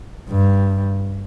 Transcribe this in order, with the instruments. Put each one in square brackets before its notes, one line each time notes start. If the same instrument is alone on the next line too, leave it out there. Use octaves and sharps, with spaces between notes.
[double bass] G2